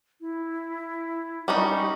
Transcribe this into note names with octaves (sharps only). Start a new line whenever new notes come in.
E4
G3 C#4 D#4 C#6